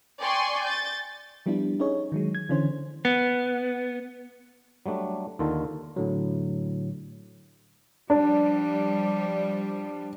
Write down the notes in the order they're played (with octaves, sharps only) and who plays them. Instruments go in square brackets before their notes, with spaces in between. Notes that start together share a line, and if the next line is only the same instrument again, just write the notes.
[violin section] D5 G5 G#5 C6 C#6
G6 A6
[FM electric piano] F3 G3 B3 D4 E4
C#4 D#4 G#4 C#5
D#3 F#3 G#3
G#6
D3 E3 C#4 E4 C5
[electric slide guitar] B3
[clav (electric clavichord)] F#3 G3 A3 D4
D#2 D3 D#3 F4 A4
[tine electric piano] A2 D3 F#3
[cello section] F3 G3 [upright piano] D4